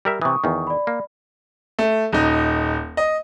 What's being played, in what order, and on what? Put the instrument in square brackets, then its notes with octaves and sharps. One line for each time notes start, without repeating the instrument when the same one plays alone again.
[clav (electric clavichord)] G3 A#4 E5
[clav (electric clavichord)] C3 E3 [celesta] C#6 D#6
[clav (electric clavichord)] E2 D#3
[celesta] D5 B5
[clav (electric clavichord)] A#3
[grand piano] A3
D#1 D#4
D#5